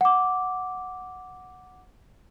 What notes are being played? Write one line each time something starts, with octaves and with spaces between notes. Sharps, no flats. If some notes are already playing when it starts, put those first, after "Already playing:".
F#5 D6